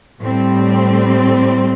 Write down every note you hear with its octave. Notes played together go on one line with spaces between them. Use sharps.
A2 G3 C4